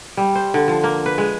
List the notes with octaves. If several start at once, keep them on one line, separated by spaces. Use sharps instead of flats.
G3
C5
D3
F3
A#3
B4
G#3